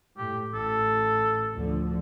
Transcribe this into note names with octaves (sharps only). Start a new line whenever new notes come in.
A2 G4
A1 A4
D2 D3 F3